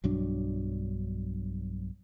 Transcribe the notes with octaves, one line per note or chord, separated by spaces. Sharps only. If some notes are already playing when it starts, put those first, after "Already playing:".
B1 G2 F#3 D4